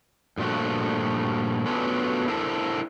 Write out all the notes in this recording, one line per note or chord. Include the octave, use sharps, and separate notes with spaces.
G2 A#2 F3 A3 F#4
F#3 A3 B3 C#4 D4 F4
D4 E4 A4 A#4 C5